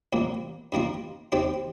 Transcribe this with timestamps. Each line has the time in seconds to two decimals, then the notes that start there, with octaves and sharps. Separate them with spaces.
0.13 C2 A#2 A#3
0.72 G2 D#3 A#3 F4
1.32 D#2 D#3 C4 G4